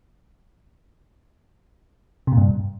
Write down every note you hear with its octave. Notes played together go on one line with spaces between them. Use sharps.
C3
A#2
G2